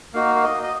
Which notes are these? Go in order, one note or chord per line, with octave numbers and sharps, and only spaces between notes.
A#3 D#4 F#4 F5
F5
D#5
D#5